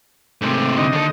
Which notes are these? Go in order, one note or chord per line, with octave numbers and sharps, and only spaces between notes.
G#2 C3 A3
D3 D#4 D#5
D#2 A4